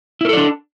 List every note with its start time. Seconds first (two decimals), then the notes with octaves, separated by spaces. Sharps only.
0.21 E4
0.25 A#4
0.29 A4
0.33 D5
0.37 D4